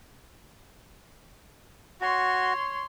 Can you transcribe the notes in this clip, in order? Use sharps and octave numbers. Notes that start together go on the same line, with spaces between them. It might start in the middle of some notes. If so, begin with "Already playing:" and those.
F#4 C#5 C6